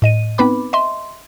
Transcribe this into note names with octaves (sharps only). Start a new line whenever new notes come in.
A2 D#5 D#7
B3 C4 D#4 B4 B5 D6
D#5 E5 C6